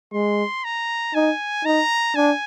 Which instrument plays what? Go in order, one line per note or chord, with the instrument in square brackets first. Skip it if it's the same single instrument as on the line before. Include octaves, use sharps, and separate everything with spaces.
[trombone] G#3 [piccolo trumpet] C6
[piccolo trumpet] A#5
[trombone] D#4 [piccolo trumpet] G#5
[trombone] D#4 [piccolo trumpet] A#5
[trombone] D4 [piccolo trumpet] G#5